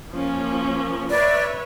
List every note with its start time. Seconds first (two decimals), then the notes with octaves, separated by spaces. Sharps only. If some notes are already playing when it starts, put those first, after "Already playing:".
0.10 F3 A#3 C#4
1.10 B4 C#5 D5 E5